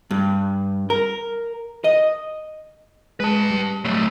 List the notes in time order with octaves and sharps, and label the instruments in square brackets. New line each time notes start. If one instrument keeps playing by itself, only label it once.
[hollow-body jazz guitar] G2
A#4
D#5
[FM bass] G#3 [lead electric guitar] B4 A5
[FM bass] G3
[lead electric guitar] F#3 A3